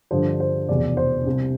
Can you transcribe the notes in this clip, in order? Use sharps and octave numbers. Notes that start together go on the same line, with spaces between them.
G1 G2 D3 F3 C5
C5
F1 E2 B2 D5
C5
C2 C3 G3